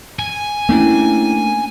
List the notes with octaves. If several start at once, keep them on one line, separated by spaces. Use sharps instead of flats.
G#5
A3 A#3 C#4 D4 E4